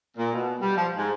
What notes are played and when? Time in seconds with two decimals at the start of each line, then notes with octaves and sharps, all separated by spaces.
0.17 A#2
0.33 B2
0.60 G3
0.77 F3
0.95 G#2